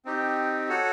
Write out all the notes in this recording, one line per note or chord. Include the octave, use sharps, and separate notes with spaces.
C4 D#4 G4
F#4 A4 C#5 F#5